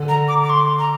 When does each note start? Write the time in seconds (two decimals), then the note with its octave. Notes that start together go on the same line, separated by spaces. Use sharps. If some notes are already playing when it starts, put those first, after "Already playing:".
Already playing: D3
0.09 A#5
0.28 D6
0.44 D6
0.50 C6
0.79 A#5